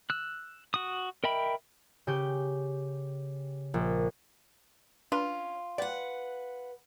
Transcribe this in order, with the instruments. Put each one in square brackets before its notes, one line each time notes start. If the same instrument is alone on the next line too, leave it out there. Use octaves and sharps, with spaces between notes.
[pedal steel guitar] E6 F#6
F#4 D#6
A#4 D#5 E5 G5 B5
[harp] C#3 G4 G6
A#1
[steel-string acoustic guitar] C#4 [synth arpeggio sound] D4 B4 [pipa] F4
[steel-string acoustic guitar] B4 F#5 [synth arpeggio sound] D5 G5